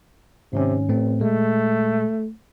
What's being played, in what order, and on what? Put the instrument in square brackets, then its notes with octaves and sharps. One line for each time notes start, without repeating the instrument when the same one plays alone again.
[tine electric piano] G#2 D#3 C#4 [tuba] C3
[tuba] A1 [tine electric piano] A2 A3 C4
[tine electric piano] A#2 G#3 [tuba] A3